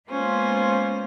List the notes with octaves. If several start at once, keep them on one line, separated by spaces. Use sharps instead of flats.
G#3 A#3 B3 C#4 F4 C5